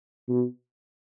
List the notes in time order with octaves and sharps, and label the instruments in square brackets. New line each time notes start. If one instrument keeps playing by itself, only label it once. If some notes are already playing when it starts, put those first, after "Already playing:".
[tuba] B2